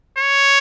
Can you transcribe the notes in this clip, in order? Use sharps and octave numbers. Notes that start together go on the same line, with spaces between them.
C#5